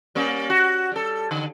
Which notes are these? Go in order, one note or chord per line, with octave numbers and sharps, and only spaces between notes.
G3 A#3 C#4
F#4
G3 A4
D3